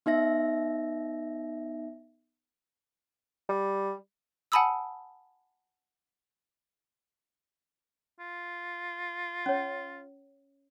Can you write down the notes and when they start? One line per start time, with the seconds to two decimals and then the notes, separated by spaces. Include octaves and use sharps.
0.06 B3 D#4 E5 A#6
3.49 G3
4.52 F#5 G#5 A5 B5 D#6 E6
8.19 F4
9.46 C#4 C#5